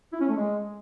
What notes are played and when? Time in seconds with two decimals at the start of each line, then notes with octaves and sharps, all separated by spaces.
0.13 E4
0.21 C#4
0.28 A3
0.36 G#3